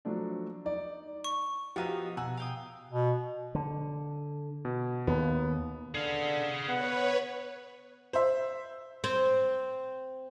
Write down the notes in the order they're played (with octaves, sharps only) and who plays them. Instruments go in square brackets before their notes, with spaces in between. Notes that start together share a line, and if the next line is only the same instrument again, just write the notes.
[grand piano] F3 F#3 A3 D4
D#4 D5
[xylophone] C#6
[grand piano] F3 [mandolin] B3 D#4 E6 [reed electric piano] F#4 G4 F5
[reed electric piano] B2 [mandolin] F#5 [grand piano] G#5 A#5 E6
[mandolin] F5 G5 D#6
[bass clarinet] B2
[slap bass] D3
[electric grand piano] B2
[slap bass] D#2 [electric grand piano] B3
[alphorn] D3 [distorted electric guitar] G#4 F5
[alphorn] B3 [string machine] B4 C#5 [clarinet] F#5
[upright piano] C5 E5
[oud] C4